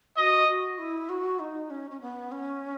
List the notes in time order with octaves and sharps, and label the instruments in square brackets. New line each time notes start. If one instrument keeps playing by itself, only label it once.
[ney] F#4 [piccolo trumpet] D#5
[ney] F#4
E4
F#4
D#4
C#4
C#4
B3
C#4